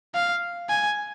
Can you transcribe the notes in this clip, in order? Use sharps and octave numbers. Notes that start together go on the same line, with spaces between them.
F5
G#5